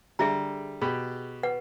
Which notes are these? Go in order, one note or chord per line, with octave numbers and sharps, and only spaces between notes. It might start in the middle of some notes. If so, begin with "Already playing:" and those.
D3 G3 G#4 E5 A#5
B2 G4 G#4 B5
B4 F#5